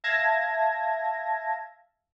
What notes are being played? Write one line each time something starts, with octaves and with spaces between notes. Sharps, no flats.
E5 F5 A5 G#6 A#6